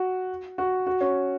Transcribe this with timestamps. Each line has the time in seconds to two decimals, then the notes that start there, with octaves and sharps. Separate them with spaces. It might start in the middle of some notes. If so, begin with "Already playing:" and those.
Already playing: F#4
0.58 F#4
0.87 F#4
1.01 C#4